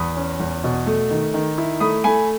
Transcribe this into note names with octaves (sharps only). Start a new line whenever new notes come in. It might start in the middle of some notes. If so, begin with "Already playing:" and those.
Already playing: E2 B5 D#6
C#4
E2
B2
A3
D#3
D#3
E4
A3 B5 D#6
A3 G#5 B5